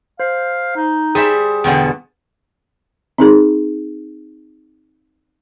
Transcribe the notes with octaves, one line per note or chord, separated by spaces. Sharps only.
C5 F5
D#4
G3 G#4 C5 E5
E2 B2 D3 G5
C4 D#4 G#4